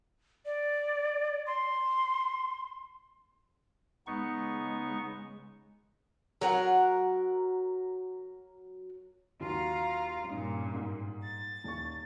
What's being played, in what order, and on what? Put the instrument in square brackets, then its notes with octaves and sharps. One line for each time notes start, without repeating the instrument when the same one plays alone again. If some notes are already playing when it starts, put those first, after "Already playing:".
[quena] D5
C6
[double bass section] C#3 G#3 [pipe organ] B3 D#4 C#6
[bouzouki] F#3 A#4 F#5
[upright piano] D#2 F#3 [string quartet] F4 F5 A#5
[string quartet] G2 A#2 [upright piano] C#4 D#4
[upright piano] G#2
[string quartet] A6
[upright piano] D#1 C#6